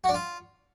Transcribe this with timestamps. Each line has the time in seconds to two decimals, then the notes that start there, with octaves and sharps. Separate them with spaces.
0.04 F#4
0.09 D4
0.14 F4